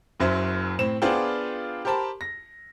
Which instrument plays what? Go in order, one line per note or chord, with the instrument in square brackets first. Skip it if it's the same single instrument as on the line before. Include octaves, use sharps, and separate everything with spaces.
[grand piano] F#1 F#2 F#3 C5 E5
A2 C4 E7
B3 D4 F4 G#4 C5 G5
G4 A#4 C5 A5 B5
A#6